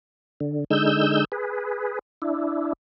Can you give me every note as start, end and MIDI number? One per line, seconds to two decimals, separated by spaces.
0.40 0.64 50
0.71 1.25 50
0.71 1.25 56
0.71 1.25 63
0.71 1.25 88
0.71 1.25 91
1.32 1.99 68
1.32 1.99 71
2.22 2.73 62
2.22 2.73 64